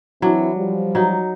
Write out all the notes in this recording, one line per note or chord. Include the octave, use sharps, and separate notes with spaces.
E3 F#3 C4 D4 E4
F3 G3
F#3 D#4